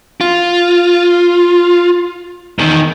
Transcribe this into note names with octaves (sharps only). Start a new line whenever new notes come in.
F4
E2 D#3